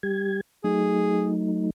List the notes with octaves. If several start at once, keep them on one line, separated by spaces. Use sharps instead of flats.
G3 G4 G#6
F#3 A3 D#4 G#4